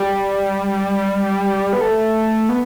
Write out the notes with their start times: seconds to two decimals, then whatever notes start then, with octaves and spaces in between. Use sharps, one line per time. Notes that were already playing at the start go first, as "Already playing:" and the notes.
Already playing: G3
1.73 B3
1.81 A3
2.49 B3